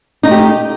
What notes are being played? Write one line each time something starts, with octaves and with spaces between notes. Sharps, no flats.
A3 D#4 G4